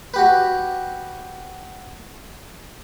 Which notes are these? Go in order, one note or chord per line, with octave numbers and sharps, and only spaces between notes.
F#4 G4 B4